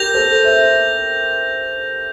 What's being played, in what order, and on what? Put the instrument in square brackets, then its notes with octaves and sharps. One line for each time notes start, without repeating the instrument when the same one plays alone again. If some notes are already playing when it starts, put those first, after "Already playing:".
Already playing: [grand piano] G4 A#4 [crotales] G6 A#6 F7
[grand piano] A4 C5
C5 E5